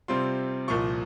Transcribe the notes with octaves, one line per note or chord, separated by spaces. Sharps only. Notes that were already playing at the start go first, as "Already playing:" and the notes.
C3 G3 C4 F4 C6
C2 A#2 F3 C#6